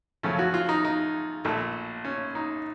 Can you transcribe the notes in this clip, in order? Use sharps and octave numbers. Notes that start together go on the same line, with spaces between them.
F#2 C#3 F3 A3 C#4
F#4
F4
D#4
D#4
A#1 A#2 A3
C#4
D#4